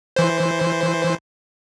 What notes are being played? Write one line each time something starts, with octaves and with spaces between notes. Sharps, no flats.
E3 C5